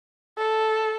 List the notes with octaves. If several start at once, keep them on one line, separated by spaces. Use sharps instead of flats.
A4